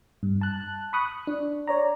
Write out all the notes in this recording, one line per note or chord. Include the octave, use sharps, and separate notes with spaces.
G2
A5 F#6
B5 C#6 D#6 F#6
F#6
D4
C#5 D5 A#5